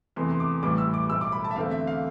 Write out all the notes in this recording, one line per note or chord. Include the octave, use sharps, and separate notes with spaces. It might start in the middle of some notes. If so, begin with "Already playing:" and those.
E2 C3 E3 A3 C6
C6
D6
A1 A2 E3 G3 D6
E6
D6
B1 A2 G3 E6
D6
B5
A5
E5
E2 D3 A3 C4 F5
E5
F5